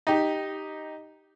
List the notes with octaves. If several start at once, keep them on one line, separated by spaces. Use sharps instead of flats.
D#4 G4